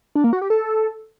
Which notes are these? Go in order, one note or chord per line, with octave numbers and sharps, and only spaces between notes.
D4
A#3
F#4
G4
A4